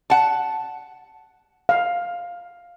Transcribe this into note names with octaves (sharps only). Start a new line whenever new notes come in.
F#5 A5
F5